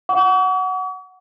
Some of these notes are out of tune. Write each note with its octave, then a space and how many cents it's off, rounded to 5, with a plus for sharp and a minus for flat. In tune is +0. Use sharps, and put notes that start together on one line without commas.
F#5 +0 C#6 +45